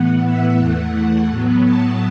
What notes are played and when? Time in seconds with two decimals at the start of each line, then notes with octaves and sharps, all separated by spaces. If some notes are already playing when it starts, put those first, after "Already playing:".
Already playing: A2 E3 B3 F#5
0.24 E5
0.59 E2 E3 A3 F#5
1.30 A2 F#3 B3
1.64 A5